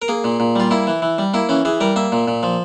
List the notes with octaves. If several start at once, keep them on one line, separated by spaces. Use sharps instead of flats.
A#4
A#3 G#4
A#2
A#2
G3 F4
A#3 E4
E3
E3
G3
A#3 E4
E3 C#4
E3 G#4
G3 A#4
A#3 E5
A#2
A#2
F3